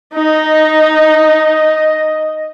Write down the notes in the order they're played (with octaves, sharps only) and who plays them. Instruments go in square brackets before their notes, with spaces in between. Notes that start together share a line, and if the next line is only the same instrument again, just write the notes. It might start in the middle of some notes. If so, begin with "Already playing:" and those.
[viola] D#4 [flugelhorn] D#5